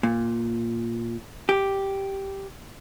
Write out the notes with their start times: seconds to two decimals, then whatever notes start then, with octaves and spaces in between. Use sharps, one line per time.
0.03 A#2
1.49 G4